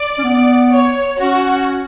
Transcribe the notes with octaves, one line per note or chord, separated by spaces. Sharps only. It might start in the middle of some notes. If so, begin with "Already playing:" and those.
Already playing: D5
C#4
B3
C#5
C#4 F#4